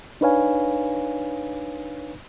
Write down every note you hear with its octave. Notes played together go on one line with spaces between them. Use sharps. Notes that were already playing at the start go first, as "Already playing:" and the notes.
D4 D#4 B4 C#5 F5 G#5